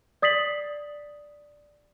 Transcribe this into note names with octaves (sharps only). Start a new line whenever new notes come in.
D5 D#6 A6 B6 C7 F#7